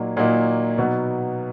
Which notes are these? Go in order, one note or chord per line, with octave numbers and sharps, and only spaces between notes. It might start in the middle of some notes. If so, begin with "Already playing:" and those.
Already playing: A#2 F#3 A#3 D#4
A#2 F#3 A#3 D#4
B2 F#3 B3 D#4